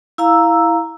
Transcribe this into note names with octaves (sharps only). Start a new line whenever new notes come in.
E4 F5 A#5 E6